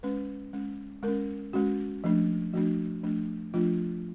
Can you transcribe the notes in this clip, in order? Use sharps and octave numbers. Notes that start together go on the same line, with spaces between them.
G#3 C#4 B4
G#3 C#4
G#3 C#4 A#4
G#3 C#4 F#4
F3 A3 D4
F3 A3 D4 F#4
F3 A3 D4
F3 A3 D4 F4